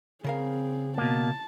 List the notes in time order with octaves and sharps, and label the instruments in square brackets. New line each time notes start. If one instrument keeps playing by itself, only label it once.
[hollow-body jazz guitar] C#3 A#4 F5 [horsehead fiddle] C4 G#4
[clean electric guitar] B2 A#3 [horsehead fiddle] A5